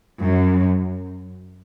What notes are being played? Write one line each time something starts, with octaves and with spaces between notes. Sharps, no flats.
F#2